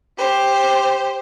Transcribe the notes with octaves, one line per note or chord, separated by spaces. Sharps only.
G4 C5